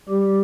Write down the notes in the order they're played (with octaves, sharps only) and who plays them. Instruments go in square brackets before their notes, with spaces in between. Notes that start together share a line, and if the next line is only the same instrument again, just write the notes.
[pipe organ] G3 G4